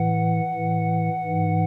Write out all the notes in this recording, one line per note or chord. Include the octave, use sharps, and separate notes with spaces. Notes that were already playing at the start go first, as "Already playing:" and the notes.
Already playing: A2 E3 F#5
A2 E3
G#2 E3